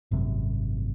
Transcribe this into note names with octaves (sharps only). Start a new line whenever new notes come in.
G#1 F#2 C3